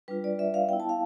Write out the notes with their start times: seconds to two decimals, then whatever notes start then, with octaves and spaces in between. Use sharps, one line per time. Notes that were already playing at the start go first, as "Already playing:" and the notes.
0.08 G3 D4 F4 B4
0.24 D5
0.39 E5
0.54 F5
0.69 B3 E4 G5
0.80 A5
0.89 F5